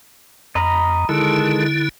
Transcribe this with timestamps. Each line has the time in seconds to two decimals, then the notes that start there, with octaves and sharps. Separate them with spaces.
0.55 F2 D#5 A#5 B5
1.09 D3 D#3 G#3 E4 A4